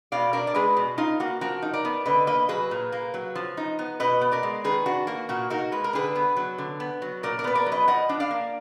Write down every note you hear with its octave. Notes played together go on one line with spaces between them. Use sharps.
B2 D5 F5
D4 A#4 D5
D5
G#3 G#4 B4
B2
D#4 F4
A#3 F#4
F3 F#4 A#4
D#4
A#4 D5
B3
D3 B4 D#5
A#3 B4 D#5
F#3 G#4 B4
A#2
A#3
F#3
F3
D#4
B3
B2 B4 D#5
B3
A#4 D5
G#3
D#3 G#4 B4
D4 F#4
A#3 F#4
A#2 F#4
D#4 F#4 A#4
G#3 B4
A#4
D3 G#4 B4
B3
F#3
D3
B3
F#3
A#2 A#4 D5
A#4 D5
B3 B4
A#4 D5
F#3
B4 D#5
F3 D#5 F#5
D4
D5 F5
A#3